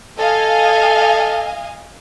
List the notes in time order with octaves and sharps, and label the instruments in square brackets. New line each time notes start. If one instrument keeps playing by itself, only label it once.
[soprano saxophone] A4 [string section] D#5 F5 G#5